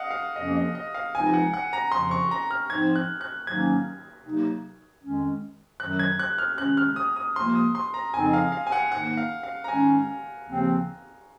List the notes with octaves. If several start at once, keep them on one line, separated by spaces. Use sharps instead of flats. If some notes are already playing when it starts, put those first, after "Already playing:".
Already playing: D#5 F5 F#5
F5
F2 C3 F3 A#3 C#4 D#5
D#5
D#5
F5
C#2 C3 F3 C4 D#4 G#5
F#5
F#5
A#5
F2 C#3 F3 C6
C#6
A#5
F6
G#2 F3 C4 D#4 G#6
F#6
F#6
G#2 D#3 F#3 A#3 C#4 G#6
C3 F#3 A#3 D#4
F2 D#3 G#3 C#4
F#2 D#3 F#3 F#6
G#6
F#6
F6
C3 D#3 G#3 C#4 F#6
F6
D#6
D#6
C#2 C3 F3 A#3 C6
D#6
C6
A#5
F2 C#3 F3 C4 D#4 G#5
F5
F5
G#5
F#5
G#2 D#3 A#3 D#4 F#5
F5
F5
A#5
G#2 D#3 G#3 C#4 G#5
D#2 C#3 F3 C4